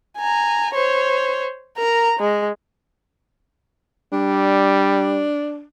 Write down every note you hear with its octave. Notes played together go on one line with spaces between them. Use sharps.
G#5 A#5
C5 C#5
A#4 A#5
G#3
G3 D4